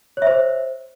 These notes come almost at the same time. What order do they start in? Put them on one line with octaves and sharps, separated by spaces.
C#5 E5 C5